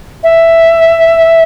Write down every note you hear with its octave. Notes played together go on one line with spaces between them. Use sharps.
E5